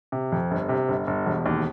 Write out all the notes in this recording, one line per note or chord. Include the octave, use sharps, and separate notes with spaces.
C3
F2
G1
C3
G1
G1
E1
D#2